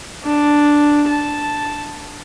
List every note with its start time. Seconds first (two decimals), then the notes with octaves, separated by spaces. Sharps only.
0.24 D4
1.08 A5